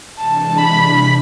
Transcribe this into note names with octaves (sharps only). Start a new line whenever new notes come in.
C3 E3 G#3 D4 A5
B5